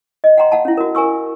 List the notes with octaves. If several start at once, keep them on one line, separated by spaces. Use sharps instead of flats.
D#5
F#5 G5 A#5 C6
F5 F#5 A5
C#4 E4
F#4 A#4
A#4 G#5 C#6 E6